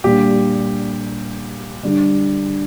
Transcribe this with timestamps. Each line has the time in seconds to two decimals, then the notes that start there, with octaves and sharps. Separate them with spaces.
0.04 A#2 G3 D4 G4
1.83 D3 G3 D4